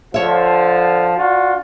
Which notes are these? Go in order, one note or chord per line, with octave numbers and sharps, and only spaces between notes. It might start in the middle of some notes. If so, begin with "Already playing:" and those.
D3 F3 C#5 E5
D4 F4 F#4